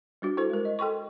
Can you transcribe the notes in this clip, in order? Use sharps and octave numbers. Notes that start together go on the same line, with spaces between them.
G3 D4 F#4
E4 F#4 A4 C5
G#3 A#4
D#5
A4 G5 C6 C#6